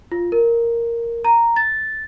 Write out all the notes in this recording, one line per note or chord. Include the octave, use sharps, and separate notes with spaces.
F4
A#4
A#5
A6